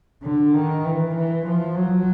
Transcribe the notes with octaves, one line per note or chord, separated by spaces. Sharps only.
D3
D#3
E3
E3
F3
F#3